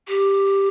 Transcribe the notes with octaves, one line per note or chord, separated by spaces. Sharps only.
G4